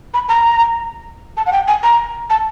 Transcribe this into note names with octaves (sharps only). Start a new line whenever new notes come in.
B5
A#5
A5
F#5
G5
G#5
A#5
A5